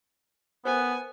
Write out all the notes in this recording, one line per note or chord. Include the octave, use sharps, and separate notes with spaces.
B3 A#4 C5 G#5